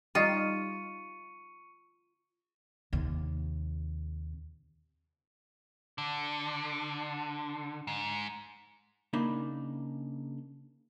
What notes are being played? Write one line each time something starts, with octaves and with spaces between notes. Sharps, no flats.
G3 D#4 F4 C#6 C#7 D#7
D#2 C3
D3
G#2
C#3 A#3 D4 D#4 B5